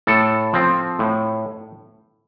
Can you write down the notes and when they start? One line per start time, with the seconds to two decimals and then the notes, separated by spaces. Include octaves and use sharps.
0.07 A2 A4
0.53 F3 C4
0.99 A2